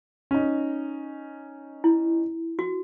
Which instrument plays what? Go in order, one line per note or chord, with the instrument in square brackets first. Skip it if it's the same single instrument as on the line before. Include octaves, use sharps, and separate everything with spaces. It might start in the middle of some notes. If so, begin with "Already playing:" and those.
[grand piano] C#4 D#4
[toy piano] E4
F#4